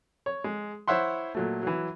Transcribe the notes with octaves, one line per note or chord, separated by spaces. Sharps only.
C#5
G#3
E4 C5 C#5 E5 F#5 C6
A#2 F#3 A3
E3 F#3